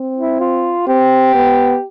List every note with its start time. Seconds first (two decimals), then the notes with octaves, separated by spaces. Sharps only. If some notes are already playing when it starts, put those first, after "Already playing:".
Already playing: C4
0.17 E4
0.40 F4
0.87 C4 G4
1.35 B3